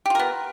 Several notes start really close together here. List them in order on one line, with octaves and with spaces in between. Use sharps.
G4 F4 A#4 B3